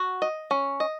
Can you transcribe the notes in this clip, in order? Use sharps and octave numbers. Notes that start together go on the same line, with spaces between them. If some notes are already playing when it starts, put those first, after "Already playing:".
Already playing: F#4
D#5
C#4
D#5